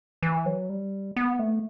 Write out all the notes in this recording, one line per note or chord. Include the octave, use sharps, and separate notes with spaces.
E3
F#3
G3
B3
A3